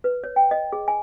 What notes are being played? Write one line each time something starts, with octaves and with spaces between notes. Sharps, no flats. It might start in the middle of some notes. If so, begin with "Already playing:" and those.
B4
C#5
G5
D#5
G#4
G#5